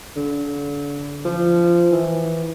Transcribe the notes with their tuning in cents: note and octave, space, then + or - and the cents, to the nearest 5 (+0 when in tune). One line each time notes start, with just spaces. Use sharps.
D3 -35
F3 -20
E3 -15